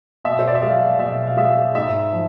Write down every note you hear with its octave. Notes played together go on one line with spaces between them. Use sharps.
B2 E5
C5
D5
E5
G#3 F5
B2 E5
F5
G#3 E5
G#2 E5
F3